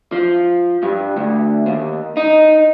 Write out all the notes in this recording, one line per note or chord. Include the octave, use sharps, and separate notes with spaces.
F3
G2
D2
D#2
D#4